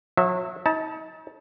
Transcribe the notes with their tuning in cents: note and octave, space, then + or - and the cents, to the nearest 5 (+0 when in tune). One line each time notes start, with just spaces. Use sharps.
F#3 -35 E5 +0
D#4 +40 A5 +0